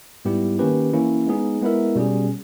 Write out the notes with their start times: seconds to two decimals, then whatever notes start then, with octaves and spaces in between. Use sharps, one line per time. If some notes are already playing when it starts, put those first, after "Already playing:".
0.25 G#2 G3 B3 E4 G4
0.59 D#3 A#3 C#4 G4 B4
0.93 E3 A#3 C#4 E4
1.27 G#3 B3 D#4 G#4
1.61 G#3 B3 E4 A#4 E5
1.96 B2 G3 C#4 G#4